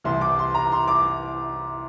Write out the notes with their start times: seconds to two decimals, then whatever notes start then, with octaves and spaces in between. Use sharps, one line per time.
0.04 C2 C3 E3 C6
0.21 D6
0.39 C6
0.55 A#5
0.72 C6
0.88 D6